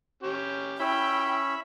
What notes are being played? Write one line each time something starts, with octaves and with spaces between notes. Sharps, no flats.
C#4 G4
C#4 E4 C#5 E5 G5 B5